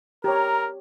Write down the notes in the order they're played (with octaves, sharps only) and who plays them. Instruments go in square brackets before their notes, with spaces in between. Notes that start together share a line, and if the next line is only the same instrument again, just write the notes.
[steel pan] G4 C#5 [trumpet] A#4 [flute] A#5